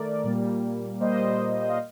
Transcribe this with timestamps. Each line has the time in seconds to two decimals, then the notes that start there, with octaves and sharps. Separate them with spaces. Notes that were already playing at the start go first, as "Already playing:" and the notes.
Already playing: D#3 A3 A#4 D5
0.24 A#2 G3 A#3
1.00 A#2 G3 A#3 C5 D#5
1.60 D#5
1.69 F5